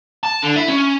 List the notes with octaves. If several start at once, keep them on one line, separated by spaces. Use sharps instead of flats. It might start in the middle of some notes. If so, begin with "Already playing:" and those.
A5
D3
E4
C#4